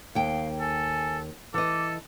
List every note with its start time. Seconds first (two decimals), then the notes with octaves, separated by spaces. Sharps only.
0.15 D#2 F5 G5
0.60 A4 G#5
1.54 E3 A4 D#5 D6